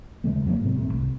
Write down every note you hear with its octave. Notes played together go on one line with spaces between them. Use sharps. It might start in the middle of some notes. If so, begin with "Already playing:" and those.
D#2 C#3 G#3 A3
F2 F#3 A3 A#3
G#2 C3
D#1 G#1 A3
C2